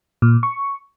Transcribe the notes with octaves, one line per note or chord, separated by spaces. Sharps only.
A#2
C#6